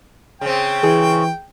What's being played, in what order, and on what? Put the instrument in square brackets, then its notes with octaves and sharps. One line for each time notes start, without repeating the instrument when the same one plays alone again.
[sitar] C#3 C4 [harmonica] G5
[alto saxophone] E3 [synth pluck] G#4